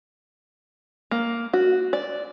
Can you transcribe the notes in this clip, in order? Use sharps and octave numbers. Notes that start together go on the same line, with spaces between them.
A#3
F#4
D5